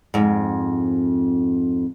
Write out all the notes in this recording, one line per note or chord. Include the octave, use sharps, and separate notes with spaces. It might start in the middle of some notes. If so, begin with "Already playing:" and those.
F2 G#2